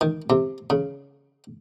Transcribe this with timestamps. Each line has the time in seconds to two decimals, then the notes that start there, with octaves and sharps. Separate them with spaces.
0.01 D#3
0.30 C3
0.70 C#3